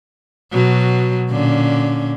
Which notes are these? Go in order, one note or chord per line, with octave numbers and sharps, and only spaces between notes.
B2 F#3
A#2 D3 C#4